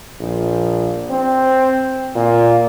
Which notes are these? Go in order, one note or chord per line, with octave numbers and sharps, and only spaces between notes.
A#1
C4
A#2